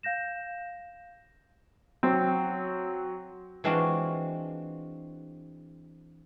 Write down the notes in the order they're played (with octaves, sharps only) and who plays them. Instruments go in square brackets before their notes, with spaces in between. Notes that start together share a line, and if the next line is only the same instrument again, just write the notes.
[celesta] F5 G6 A#6 E7
[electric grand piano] F#3 [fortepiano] C4
[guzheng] E3 G#3 C4 D4 F4 F#4